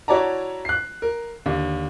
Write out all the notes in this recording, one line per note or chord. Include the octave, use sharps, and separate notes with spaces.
E4 F#4 C#5 D5 A5 A#5
F#6 C7
A#4
D#2 D3